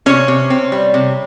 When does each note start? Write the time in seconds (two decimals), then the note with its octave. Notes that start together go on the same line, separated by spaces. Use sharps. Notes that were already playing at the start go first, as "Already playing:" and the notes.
0.06 C3 C#4 C#5
0.28 C3
0.50 C4
0.72 G3
0.94 C3